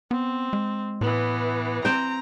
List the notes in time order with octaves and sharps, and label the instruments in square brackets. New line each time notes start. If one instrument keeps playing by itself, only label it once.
[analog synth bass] B3 [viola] C4
[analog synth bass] G#3
[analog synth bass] A2 [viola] E3 B3
[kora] C4 G5 [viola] A#5